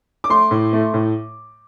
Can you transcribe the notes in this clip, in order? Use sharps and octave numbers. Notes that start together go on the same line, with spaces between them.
D6
A3 C6
A2
A3
A2